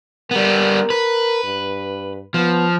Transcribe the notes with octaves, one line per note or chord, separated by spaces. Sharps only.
G3 B3 A#4
B4
G2
F3 B3